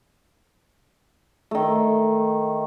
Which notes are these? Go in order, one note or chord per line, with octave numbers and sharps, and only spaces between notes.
D#3 A3